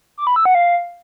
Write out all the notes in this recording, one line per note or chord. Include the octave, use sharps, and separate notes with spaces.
D6
B5
E6
F#5
F5